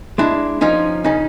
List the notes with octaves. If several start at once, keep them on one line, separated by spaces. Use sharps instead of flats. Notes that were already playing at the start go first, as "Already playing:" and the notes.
G#3 D4 E4
F3 C#4 D#4
C#3 C#4 D#4